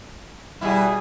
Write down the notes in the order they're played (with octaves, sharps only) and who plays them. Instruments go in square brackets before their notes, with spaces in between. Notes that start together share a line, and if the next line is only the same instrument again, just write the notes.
[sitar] B2 E4 [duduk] G3 [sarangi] G#4